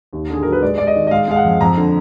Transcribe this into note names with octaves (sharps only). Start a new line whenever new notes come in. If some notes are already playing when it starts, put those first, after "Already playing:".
D#2
D3 G#4
F#3 A#4
B4
G#3 D5
G#3 D5
D#5
D#3
D#5
G#3 F5
G#3 F5
F#5
F2
F2 A#5
D3